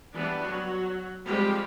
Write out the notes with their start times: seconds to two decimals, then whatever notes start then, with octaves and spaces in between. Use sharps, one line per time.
0.14 E3 G3 B3 D4 E4
0.42 F#3 F#4
1.27 F3 G3 G#3 C4 G4